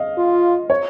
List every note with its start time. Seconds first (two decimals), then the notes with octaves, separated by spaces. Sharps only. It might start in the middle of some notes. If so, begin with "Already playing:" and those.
Already playing: D#5 F5
0.18 F4
0.70 C#5